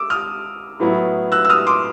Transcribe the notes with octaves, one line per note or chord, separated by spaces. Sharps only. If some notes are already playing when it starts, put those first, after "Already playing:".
Already playing: D6 E6
D#6 F6
A2 F#3 B3 E4
E6 F#6
E6
D#6 F6
C6 D6